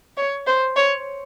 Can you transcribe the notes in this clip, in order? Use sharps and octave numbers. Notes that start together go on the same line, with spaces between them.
C#5
C5
C#5